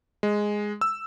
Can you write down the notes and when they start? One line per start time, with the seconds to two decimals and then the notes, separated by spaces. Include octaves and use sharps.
0.23 G#3
0.81 E6